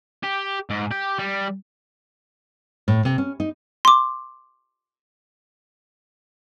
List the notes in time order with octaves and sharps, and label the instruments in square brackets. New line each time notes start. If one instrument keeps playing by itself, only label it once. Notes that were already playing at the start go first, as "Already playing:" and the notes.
[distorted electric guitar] G4
G#2
G4
G3
[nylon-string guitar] A2
C3
C#4
D#4
[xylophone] C6 D6